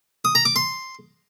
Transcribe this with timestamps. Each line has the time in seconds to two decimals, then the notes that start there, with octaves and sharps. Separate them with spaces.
0.25 D#6
0.35 A#5
0.45 D6
0.56 C6